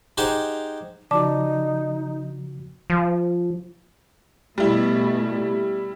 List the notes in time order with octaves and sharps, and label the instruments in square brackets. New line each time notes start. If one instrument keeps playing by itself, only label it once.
[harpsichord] D#4 G4 G#4 C5 F#5
[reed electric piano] C#3 F3 F#4 [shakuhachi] D#4 [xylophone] D5 A5 D6
[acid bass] F3
[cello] B2 A3 [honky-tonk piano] G3 E4